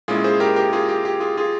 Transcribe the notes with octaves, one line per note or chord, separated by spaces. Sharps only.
A#2 G#3 C#4 E4 F4 G#4
G#4 C5
G4 A#4
G4 A#4
F4 G#4
G4
G4
F4 G#4
F4 G#4